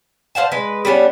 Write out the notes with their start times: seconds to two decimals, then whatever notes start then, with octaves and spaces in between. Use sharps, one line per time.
0.35 C5 F5 F#5 A5
0.52 G#3 B4
0.85 G3 B3 C#4 D4